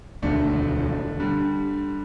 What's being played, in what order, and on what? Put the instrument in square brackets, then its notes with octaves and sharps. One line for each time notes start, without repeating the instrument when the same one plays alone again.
[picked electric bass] E1 D2 D3 [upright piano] A3 D4
[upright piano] D3 G3